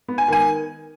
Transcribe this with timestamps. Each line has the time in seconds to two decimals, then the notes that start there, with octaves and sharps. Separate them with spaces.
0.08 B3
0.18 G#5
0.28 D#3 G#5